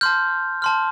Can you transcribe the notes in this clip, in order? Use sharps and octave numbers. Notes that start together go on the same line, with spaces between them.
A5 C6 F6 G6
A5 C6 F6